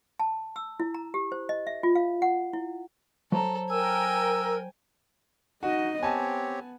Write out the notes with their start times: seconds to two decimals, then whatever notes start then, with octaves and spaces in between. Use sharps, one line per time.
0.20 A5
0.56 E6
0.80 E4
0.94 A#5
1.14 G4
1.32 C5
1.49 D#5
1.67 E5
1.83 F4
1.95 F5
2.22 F#5
2.53 E4
3.32 F#3 A4 C5 A#5
3.70 A#4 G5 G#5 E6
5.63 D#4 F#4 D#5
6.03 B3 C4 G4 C#5 G#5 A5